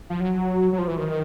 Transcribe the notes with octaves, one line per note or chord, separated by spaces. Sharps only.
F3
F#3
F#3
F3
E3
D#3